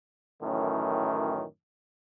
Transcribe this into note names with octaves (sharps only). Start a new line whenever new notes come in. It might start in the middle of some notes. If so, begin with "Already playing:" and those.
F#2 A2 D#3 E3 C#4